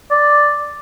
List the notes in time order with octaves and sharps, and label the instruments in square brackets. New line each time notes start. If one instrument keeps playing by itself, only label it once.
[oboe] D5